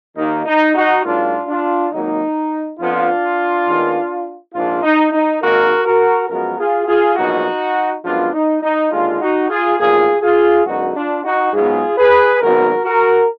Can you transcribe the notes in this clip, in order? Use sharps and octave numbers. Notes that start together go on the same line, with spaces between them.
D#2 D#3 A#3 D#4
D#4
D#4 F#4
G#2 F#3 A#3 D4 F4
D4 F4
G#1 G#2 F#3 A#3 D#4
F2 F3 B3 D4 F4
D#2 D#3 G#3 B3
A#1 G#2 F3 D4 F4
D#4
D#4
G#1 G#2 D#3 A#3 F#4 A#4
F#4 A#4
F#2 F3 G#3 B3 F#4 A#4
F4 G#4
F4 G#4
A#1 G#2 F#3 B3 D#4 F#4
F#2 F3 G#3 B3 D4 F4
D#4
D#4
D#2 D3 G#3 D4 F4
D#4 F#4
F4 G#4
B1 A#2 F3 F4 G#4
F4 G#4
F#2 D3 G#3 B3 D#4 F#4
D4 F4
D#4 F#4
G#2 F#3 B3 F4 G#4
G#4 B4
G#1 F#2 D#3 F#3 B3 F#4 A#4
F#4 A#4